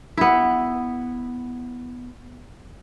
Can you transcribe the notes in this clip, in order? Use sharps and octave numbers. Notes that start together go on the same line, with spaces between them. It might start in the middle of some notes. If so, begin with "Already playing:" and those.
B3 E4